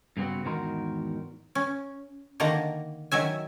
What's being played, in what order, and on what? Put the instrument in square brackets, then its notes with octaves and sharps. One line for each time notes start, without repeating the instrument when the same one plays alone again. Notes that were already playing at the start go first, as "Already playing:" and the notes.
[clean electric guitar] G2 C#3 B3 C4 F#4
E2 G#2 D#3 F#4 A#4 C6
[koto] C#4
D3 D#3 A#3 A#5
D#3 F#3 E5 G#5